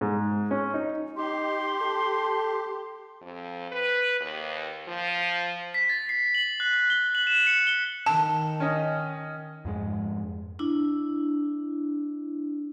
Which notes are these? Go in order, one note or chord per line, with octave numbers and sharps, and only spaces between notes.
G#2
C#4
D#4
D#4 G4 C6
A4
F2
B4
D#2
F3
B6
A6
C7
F#7
F#6
F#6
G7
F#7
E7
C#7
G7
D#3 A5
C#4 D#5
F2 G#2 G#3
D4 E4